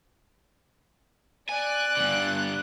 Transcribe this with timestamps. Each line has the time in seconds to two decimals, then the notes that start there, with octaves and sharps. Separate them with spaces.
1.49 D5 G#5 F#6
1.97 G2 D3